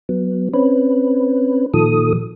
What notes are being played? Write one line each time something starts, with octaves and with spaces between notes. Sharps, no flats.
F#3 B3
C4 C#4 B4
A#2 D#3 F3 A4 D#6